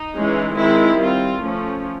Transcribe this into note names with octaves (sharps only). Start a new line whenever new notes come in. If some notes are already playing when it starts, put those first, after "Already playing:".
Already playing: D#4
E3 G#3 C#4
D#3 G#3 C4 E4
G3 C4 F4
F3 A3 C#4